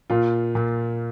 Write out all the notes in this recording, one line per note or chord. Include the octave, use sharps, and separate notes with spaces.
A#2 F4
A#2